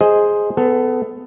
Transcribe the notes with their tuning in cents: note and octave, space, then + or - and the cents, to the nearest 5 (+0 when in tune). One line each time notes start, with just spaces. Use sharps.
G#4 +0 C5 +0 D#5 +0
B3 +25 A4 +0